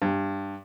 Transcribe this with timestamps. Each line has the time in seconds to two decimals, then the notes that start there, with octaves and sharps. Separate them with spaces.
0.02 G2